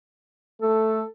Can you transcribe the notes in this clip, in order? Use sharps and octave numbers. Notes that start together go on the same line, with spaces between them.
A3 A4